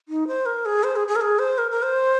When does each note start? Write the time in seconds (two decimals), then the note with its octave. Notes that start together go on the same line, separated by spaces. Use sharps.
0.09 D#4
0.27 C5
0.46 A#4
0.66 G#4
0.84 C5
0.96 G#4
1.08 G#4
1.16 A#4
1.21 G#4
1.39 C5
1.58 A#4
1.71 A#4
1.83 C5